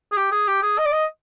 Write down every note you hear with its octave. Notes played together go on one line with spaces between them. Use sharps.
G#4
G4
G#4
G4
G#4
D#5
D5
D#5